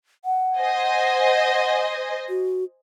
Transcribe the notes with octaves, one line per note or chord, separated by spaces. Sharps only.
F#5
C5 D#5 G#5
F#4